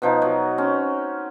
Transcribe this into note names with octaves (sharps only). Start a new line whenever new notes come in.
B2 F3 D#4
F#3 F#4
C4 C#4